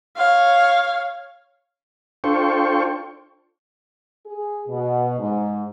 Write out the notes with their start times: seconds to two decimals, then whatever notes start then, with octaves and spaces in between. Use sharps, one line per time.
0.17 C#5 F5
2.24 D4 F4 A4 C5 G5 C#6
4.26 G#4
4.68 B2
5.20 G#2